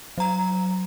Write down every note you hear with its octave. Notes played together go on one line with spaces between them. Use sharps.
F#3 A#5